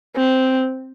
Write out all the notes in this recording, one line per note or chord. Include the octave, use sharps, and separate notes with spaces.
C4